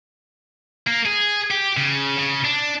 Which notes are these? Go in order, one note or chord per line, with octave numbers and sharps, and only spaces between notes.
A#3
G#4
G4
C#3
C#3
D4